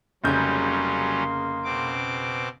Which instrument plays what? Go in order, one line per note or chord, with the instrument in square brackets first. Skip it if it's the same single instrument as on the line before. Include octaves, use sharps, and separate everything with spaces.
[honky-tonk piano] F1 C#3 G6 [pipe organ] F#3 G3 C#4 [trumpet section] A#3 C6
[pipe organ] B2 C4 D6